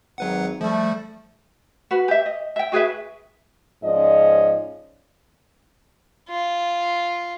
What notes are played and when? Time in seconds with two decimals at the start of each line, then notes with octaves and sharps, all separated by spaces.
0.18 G#1 F#3 B4 F#5
0.61 F3 G3 A3
1.91 F#4 B4
2.08 G4 E5
2.26 D#5
2.56 E5 G5
2.72 F#4 G#4 B4 E5
3.83 G#2 F3 C#4 D5 D#5
6.29 F4